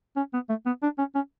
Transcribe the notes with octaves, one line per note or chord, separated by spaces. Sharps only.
C#4
B3
A3
B3
D4
C#4
C#4